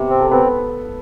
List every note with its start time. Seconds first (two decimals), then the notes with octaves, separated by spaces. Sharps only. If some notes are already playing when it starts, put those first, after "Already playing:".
Already playing: C3 B3 B4
0.09 C4
0.20 A4
0.31 B3 C4 B4